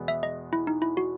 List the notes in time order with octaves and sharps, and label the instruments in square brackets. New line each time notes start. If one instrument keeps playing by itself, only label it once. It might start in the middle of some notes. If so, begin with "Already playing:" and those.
Already playing: [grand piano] E2 B2 G#3 B3
[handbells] E5
D#5
E4
D#4
E4
F#4